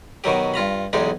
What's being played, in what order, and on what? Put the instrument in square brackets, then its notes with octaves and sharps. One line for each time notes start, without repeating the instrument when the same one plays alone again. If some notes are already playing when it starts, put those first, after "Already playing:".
[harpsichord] B2 D#3 F#3 G4
G2 F4 A#5 B5
B1 E2 G#3 D#4 G4